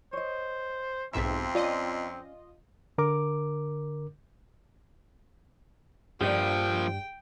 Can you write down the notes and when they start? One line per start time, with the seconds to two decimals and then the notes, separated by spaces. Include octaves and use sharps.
0.13 C5 C#5 D#5
1.14 B1 F2 G#2 C4 E5
1.55 C#4 F4 D5 D#5
2.98 D3 A#4 D6
6.21 G2 A#2 F3 G4 D5 G5